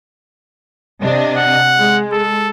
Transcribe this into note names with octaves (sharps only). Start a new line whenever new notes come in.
C3 D4 D#5
F#5
G#3
A4